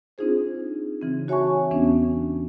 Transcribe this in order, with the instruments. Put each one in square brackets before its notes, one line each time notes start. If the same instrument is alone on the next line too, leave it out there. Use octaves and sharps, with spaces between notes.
[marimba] C4 D4 D#4 F4 G#4 C5
C#3 E3 C4
F#4 C#5 E5 G#5 A5 C#6
E2 E3 B3 C#4 D4